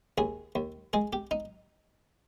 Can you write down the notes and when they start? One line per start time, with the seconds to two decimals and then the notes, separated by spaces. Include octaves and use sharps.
0.18 D#2 G#4
0.55 D#2
0.93 G#3 G#4
1.13 G4
1.31 D#4